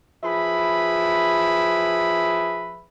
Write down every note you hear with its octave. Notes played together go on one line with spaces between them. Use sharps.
F3 G#4 B4 E5 B5